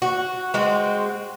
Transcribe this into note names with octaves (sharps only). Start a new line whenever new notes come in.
F#4
G#3 C4 F#4